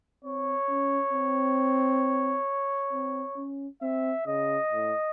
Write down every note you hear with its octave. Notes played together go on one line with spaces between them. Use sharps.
C4 C#5
C#4
C4
C4
C#4
C4 E5
C#3 D#5
A2